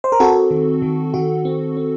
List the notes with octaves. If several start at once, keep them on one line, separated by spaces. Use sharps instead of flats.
C5
A#4
C4 F#4 A4
D#3
D#3
D#3 F#4
C4
C4